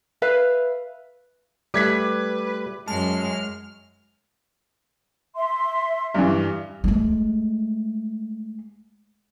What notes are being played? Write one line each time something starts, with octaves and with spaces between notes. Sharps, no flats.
B4 E5 F5
G3 A3 B4 D6 G#6 B6
F#2 G#3 A5 F6
E5 C6
G2 E3
G#3 A3